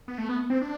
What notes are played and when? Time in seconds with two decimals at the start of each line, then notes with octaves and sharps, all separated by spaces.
0.08 B3
0.18 A3
0.29 B3
0.50 C4
0.61 D4